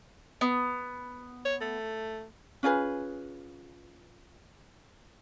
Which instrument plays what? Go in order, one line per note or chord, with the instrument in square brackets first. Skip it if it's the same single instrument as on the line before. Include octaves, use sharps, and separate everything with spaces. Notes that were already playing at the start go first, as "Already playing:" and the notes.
[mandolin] B3
[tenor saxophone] C#5
A3
[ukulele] C#4 F4 G#4 B4